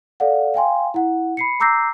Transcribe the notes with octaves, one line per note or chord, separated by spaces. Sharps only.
A4 D5 F5 F#5
F5 G5 G#5 C6
E4 F#5
B5 C7 C#7
A#5 D6 E6 G6 A#6 C7